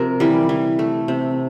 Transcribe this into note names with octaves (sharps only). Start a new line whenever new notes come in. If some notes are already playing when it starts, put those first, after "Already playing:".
Already playing: C3 F3 A#4
E3 G3
E3
A3
C3